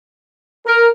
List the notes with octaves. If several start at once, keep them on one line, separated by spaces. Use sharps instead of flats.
A#4